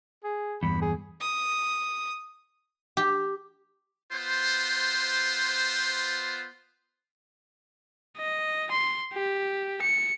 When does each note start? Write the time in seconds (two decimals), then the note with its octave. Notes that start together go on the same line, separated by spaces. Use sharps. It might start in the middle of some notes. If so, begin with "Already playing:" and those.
0.24 G#4
0.63 E2 G2 B5
0.82 G#4
1.21 D#6
2.97 G4
4.12 B3 F4 C5
8.18 D#5
8.71 C6
9.13 G4
9.82 C#7